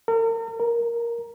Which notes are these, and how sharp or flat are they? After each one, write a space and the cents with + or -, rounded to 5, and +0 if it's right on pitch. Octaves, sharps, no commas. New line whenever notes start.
A#4 -40
A#4 +5